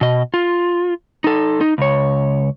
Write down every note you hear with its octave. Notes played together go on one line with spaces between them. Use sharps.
B2 D#5
F4
D#4 A4
D#4
C#2 C#5